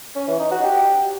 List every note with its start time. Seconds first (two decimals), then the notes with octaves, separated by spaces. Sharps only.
0.16 C#4
0.28 E3
0.40 D#4
0.52 F#4
0.63 G4